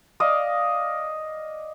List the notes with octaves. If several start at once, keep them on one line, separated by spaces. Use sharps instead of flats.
D5 D#5 F5